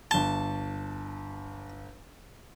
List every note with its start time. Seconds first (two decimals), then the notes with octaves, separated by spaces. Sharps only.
0.11 G1 A5 G7